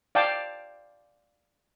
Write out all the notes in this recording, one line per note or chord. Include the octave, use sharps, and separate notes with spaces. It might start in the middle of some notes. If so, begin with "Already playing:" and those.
D5 F5 G5 A5 D6